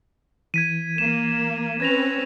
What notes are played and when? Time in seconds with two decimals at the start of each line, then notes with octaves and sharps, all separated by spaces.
0.54 E3 G#6 B6 D#7
0.98 A#3 E7
1.80 C4 C#4 B4 G#6 A#6 F7